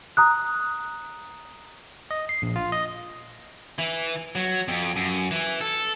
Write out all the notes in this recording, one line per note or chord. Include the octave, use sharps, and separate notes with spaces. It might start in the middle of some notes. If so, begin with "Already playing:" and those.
A#5 D#6 F#6
D#5
C7
A#1
F4
D#5
E3
F#3
F2
F#2
E3
A4